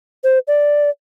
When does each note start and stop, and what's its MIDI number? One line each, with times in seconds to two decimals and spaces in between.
0.24 0.39 72
0.48 0.90 74